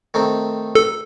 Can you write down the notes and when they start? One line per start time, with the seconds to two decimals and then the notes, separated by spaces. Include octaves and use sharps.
0.14 D#3 A3 C4
0.75 A4